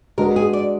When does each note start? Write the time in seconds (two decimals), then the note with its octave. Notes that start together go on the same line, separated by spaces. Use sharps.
0.18 G#3 D4 F#4 A#4 B4
0.36 G#4
0.53 D5